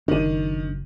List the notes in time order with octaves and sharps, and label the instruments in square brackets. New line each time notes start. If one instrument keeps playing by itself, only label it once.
[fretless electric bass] F#1 [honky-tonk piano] D#3 D#7 [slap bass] D4